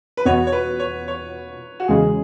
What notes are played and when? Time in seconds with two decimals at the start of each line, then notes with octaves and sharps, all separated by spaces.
0.17 B4
0.25 E2 B2 B3 F#4 C#5
0.47 C#5
0.52 B4
0.80 C#5
1.08 C#5
1.80 F#4
1.88 E2 C#3 G#3 G#4